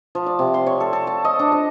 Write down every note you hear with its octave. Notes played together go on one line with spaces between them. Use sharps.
F3
D5
C3
C6
C#5
A4
A4
A5
D#5
D4
D#5